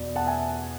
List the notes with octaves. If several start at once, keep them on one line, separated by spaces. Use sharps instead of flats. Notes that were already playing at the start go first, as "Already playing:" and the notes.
Already playing: E2 B2 D5
F#5 A5
E5 G#5